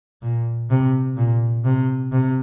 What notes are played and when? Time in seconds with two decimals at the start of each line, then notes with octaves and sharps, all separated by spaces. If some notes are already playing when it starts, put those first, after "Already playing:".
0.22 A#2
0.70 C3
1.17 A#2
1.65 C3
2.12 C3